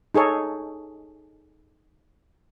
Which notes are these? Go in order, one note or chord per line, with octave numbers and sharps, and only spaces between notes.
D#4 G#4 A4 C#5